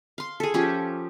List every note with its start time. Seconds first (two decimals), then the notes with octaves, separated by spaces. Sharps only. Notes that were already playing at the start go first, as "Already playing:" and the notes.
0.18 F5 C6
0.40 G#4 A4
0.54 F3 C#4 G4